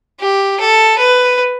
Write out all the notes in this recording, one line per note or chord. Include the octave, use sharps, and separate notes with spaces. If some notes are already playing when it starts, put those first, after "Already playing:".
G4
A4
B4